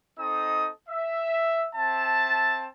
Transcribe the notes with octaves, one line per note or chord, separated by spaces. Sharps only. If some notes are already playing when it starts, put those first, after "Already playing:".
C4 D#4 A4 D#5 D#6
E5
C4 E5 A5